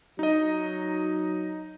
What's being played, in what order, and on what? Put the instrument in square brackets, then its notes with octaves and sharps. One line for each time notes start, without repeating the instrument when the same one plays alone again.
[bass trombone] F#3 [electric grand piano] D#4 D#5